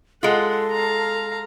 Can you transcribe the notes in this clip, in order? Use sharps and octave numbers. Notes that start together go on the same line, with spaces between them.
G#3 F4 A4 F#5
F5 A#5